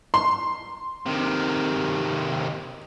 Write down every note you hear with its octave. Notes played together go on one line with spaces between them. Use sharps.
C6
C3 D#3